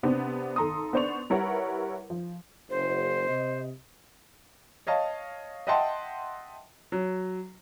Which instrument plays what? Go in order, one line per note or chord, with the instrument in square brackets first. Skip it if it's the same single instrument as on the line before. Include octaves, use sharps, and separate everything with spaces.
[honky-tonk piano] C3 B3 C4 D4
G#1 A4 A#5 C6 D#6
B3 D4 C5 D5 C#6 F7
G3 E4 A#4 B4 C#5 F#5
F3
[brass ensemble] F#1 [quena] C5
[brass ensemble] C3 D#5
[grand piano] C#5 D#5 F5 A5
D#5 E5 F#5 G5 A5 C6
F#3